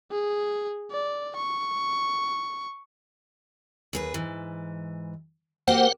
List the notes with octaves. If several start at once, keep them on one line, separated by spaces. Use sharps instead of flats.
G#4
D5
C#6
D#2 G#4 B4
G#2 E3
A#3 F#4 G4 C5 F#5